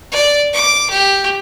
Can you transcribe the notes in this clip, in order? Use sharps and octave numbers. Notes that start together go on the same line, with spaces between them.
D5
D6
G4